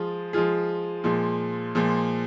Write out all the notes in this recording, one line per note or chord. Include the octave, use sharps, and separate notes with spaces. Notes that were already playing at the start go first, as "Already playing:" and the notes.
Already playing: F3 G#3 F4 G#4
F3 G#3 F4 G#4
A#2 F3 G#3
A#2 F3 G#3